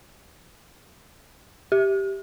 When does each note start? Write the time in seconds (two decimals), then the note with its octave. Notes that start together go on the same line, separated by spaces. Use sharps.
1.72 G4